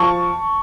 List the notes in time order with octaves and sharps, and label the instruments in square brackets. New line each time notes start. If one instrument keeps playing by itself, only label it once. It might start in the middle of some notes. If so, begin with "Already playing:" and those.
Already playing: [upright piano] F3 A5 C#6